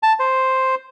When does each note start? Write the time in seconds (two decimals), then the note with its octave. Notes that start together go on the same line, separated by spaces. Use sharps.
0.03 A5
0.19 C5